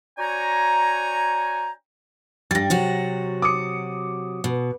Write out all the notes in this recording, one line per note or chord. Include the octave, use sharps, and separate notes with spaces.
D4 F#4 C#5 G5 G#5 A#5
G2 G3 A6 A#6
C3 F#3 F#4
D6 D#6 C#7
B2